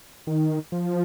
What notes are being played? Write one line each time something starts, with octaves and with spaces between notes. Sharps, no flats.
D#3
F3